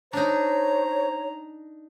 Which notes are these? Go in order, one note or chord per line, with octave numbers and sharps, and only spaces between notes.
D4 D#4 C5 C#5 A#5